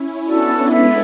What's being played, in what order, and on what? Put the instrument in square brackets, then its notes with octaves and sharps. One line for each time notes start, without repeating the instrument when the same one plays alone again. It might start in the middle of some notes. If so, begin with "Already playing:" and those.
Already playing: [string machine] C#4 E4
[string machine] B3 D4 [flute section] F#4 A4 D5
[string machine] G#3 B3 [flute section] E4 A4 E5